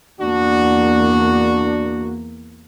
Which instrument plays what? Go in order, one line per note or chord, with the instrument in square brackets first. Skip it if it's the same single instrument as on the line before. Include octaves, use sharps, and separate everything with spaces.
[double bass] E2 A#3 [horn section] D4 F#4